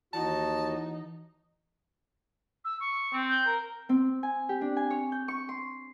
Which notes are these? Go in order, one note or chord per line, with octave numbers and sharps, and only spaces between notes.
D#2 E3 D#4 F#4 A5
E6
C#6
C4
G6
A#4
C4
G#5
G4
D4
G#5
C#5
G6
C#6
C6